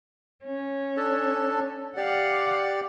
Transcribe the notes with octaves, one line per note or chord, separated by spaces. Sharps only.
C#4
D4 A4 A5
G4 D5 F5 F#5